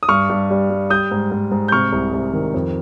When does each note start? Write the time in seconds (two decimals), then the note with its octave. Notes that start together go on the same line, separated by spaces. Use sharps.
0.03 D#6
0.09 G2 C#6 F6
0.30 G2
0.50 G3
0.70 G3
0.90 G3 D#6 G6
1.11 G#2
1.31 G#2
1.51 G#2
1.68 G6
1.72 C3 C#6 F6
1.93 C2
2.13 C2
2.33 D#3
2.54 F2